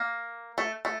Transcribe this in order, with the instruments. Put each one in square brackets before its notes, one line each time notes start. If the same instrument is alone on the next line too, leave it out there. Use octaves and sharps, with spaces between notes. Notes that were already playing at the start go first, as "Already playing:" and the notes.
Already playing: [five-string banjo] A#3
A3
A3